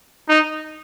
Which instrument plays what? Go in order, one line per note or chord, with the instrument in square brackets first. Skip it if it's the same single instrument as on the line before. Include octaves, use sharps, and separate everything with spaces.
[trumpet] D#4